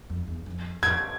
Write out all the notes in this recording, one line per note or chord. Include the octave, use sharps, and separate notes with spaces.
F2
E2
F2
F2 G#6